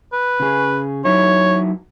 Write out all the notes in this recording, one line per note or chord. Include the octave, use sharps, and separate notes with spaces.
B4
C#3 G#4
F#3 D#4 E4 C#5